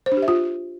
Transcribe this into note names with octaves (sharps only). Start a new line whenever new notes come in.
C5
D4
G4
E5
F4